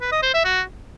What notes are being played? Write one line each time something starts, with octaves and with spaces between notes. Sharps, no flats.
B4
D#5
C5
E5
F#4